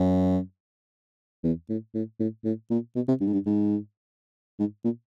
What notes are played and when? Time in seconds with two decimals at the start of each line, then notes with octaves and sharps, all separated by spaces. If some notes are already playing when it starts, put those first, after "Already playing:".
Already playing: F#2
1.44 E2
1.69 A2
1.94 A2
2.19 A2
2.44 A2
2.70 A#2
2.95 B2
3.08 C3
3.20 G2
3.27 G#2
3.33 G2
3.46 G#2
4.59 G#2
4.84 A#2